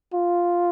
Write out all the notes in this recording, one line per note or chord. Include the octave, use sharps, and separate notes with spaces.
F4